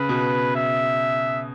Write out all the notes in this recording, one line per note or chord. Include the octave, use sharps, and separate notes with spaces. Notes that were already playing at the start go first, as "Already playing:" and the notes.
Already playing: C#3 B4
B2
E5